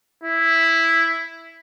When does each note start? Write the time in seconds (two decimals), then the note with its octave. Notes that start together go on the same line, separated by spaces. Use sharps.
0.24 E4